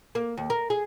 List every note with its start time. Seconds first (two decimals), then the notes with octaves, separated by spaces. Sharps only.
0.15 A#3
0.37 D#2
0.50 A#4
0.70 G#4